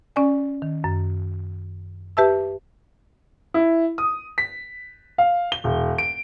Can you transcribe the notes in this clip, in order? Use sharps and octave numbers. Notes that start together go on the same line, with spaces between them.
C#4 D5 G#5
D#3
F#2
G4 B4 E5 A5 E6
E4
D#6
B6
F5
G7
E1
D7